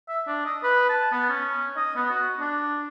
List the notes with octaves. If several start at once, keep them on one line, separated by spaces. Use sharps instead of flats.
E5
D4
D#5
B4
A5
B3
C#4
D#5
B3
F#4
D4